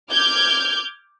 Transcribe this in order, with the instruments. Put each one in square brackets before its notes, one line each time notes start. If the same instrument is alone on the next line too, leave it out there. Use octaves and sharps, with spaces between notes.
[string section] D6 F6 G6 G#6